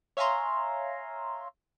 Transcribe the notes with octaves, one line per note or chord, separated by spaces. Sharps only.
C#5 E5 F5 G#5 A#5 C6